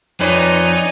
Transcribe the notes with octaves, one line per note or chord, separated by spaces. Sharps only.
F2 C4 D#4 B4 C#5 D5 G#5